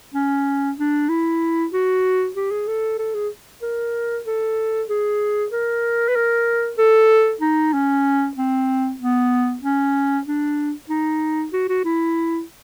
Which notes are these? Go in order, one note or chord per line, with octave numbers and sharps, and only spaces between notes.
C#4
D4
E4
F#4
G4
G#4
A4
A4
G#4
A#4
A4
G#4
A#4
B4
A#4
A4
D#4
C#4
C4
B3
C#4
D4
D#4
F#4
F#4
E4